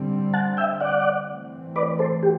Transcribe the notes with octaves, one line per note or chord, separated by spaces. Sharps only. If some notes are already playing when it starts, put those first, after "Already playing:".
Already playing: D3 G3 C4
F#5 A5
E5 G5
D5 F#5
E3 A3 C4
B4 D5
A4 C5
G4